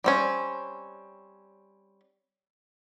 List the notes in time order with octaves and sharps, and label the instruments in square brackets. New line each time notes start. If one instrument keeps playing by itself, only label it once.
[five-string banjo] G3 C4 C#4